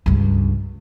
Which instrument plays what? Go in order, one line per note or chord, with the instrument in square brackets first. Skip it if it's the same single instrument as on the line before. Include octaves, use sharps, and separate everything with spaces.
[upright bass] C#2 G2